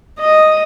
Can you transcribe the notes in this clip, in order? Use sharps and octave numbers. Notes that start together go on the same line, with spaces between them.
D#5